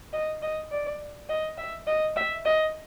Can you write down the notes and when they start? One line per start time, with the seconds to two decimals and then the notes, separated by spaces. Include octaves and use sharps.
0.13 D#5
0.42 D#5
0.71 D5
1.29 D#5
1.58 E5
1.87 D#5
2.16 E5
2.45 D#5